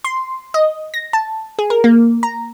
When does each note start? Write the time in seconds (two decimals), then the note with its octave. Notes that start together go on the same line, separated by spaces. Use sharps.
0.04 C6
0.54 D#5
0.94 A#6
1.13 A5
1.59 G#4
1.70 A#4
1.84 A#3
2.23 A#5